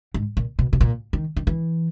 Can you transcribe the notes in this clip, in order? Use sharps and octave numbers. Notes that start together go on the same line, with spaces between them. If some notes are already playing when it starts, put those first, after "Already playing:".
G#2
A#2
B2
B2
A#2
D#3
D#3
E3